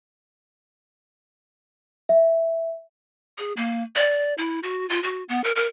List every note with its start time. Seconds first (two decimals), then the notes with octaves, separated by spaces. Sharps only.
2.09 E5
3.38 G#4
3.57 A#3
3.96 D5
4.38 E4
4.63 F#4
4.89 F4
5.03 F#4
5.29 B3
5.44 A#4
5.56 A#4